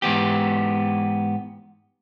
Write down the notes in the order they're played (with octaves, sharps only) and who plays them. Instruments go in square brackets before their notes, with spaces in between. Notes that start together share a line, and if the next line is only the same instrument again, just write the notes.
[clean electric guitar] G#2 E3 B3 G4